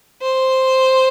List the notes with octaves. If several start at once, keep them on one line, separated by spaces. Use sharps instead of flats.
C5